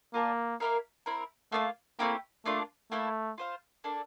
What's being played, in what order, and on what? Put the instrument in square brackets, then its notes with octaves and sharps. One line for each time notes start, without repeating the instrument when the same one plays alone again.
[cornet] A#3 [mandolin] F4 A#4 D5 A5
[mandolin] A#3 E4 A#4 F5
C4 E4 A#4
[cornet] A3 [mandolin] A#3 D4 F4
[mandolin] A3 C4 E4 G4 [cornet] A#3
[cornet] A3 [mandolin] A#3 D4 F4
[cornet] A3 [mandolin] A#3 E4 A4
[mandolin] F4 C5 F5
A#3 D4 A4